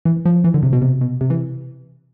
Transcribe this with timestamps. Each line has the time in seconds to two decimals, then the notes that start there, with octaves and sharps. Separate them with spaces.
0.05 E3
0.25 F3
0.44 E3
0.54 D3
0.63 C3
0.73 B2
0.82 C3
1.01 B2
1.21 C3
1.30 E3